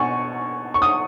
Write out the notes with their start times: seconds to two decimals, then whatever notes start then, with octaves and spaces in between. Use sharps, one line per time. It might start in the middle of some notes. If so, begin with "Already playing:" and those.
Already playing: B2 G#5 C#6
0.74 C#6
0.82 D#6